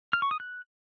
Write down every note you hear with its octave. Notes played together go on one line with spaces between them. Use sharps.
F6
C#6
D#6
F#6